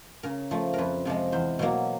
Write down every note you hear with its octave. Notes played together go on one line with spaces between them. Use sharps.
C#3 A#4
F3 A3
F2 A#4 B4
C3 F3 G#3
E2 C5
B2 F#3 A#3